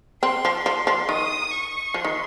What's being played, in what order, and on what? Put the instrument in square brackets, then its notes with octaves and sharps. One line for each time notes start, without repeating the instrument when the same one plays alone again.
[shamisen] C4 [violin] C6
[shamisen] F3
[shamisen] F3 [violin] C6
[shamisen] F3
[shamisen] D#3 [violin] D#6
[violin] C#6
[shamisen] F3 [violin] C6
[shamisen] D#3